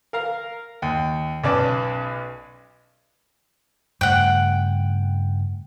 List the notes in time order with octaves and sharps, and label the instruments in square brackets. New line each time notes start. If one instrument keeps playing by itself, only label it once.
[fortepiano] A#4 F5 A#5
D#2
B1 C#4 B4 D5 A5 D6
[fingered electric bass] G2 C#3 A3 [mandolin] F#5 G5